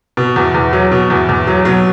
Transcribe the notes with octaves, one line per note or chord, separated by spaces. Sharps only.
B2
E2
E2
F#3
B2
E2
E2
F#3
B2 F#3